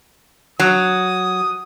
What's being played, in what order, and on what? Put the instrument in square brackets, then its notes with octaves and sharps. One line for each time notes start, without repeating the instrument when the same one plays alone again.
[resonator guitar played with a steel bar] F#3 [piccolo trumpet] D#6